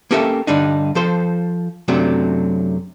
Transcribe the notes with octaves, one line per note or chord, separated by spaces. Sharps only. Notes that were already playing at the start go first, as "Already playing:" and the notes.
A#3 C#4 G4 A4 A#4 E5
G2 D3 G3 D4 D#4
F3 A4 C5
F#2 C3 F#3 A3 D4